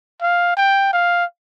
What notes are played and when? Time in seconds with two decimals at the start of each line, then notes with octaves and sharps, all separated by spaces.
0.21 F5
0.57 G5
0.93 F5